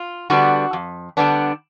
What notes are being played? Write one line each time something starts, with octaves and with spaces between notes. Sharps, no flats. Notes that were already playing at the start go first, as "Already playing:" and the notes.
Already playing: F4
D3 G3 B3 D4 F#4
F2
D3 G3 B3 D4